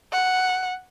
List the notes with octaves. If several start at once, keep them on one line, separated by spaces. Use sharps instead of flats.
F#5